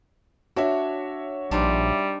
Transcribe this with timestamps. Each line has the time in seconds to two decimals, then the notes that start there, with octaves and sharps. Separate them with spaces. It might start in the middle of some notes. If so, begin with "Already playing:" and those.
0.56 D4 F#4 C#5 E5
1.51 A#1 G3 D4 D#4 C5